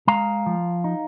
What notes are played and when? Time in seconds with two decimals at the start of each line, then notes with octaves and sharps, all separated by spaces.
0.07 G#3 F5 A#5
0.46 F3
0.84 D#4